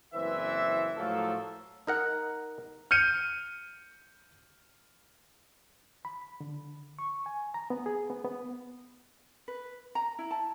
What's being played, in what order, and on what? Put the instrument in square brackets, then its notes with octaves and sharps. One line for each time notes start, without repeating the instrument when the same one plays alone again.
[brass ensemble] F#1 E3 C4 B4 E5
A2 F3 F#3 A3 A#3 A4
[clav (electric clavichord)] D#4 A#4 F#5
[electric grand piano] F6 G6 C#7 D#7
[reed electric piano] B5
D3
C#6
G#5
A#5
B3
G#4
B3
B3
[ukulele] B4
A#5
E4
A5